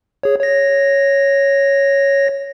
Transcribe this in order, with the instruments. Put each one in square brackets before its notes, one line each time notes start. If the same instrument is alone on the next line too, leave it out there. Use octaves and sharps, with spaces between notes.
[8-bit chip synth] G#4 C#5
C#5 A#6